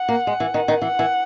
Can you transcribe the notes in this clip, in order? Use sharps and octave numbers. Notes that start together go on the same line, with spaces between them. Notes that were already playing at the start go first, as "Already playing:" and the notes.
Already playing: F#5
A#3
G#3
E3
D#3
D#3
E3 F#5
E3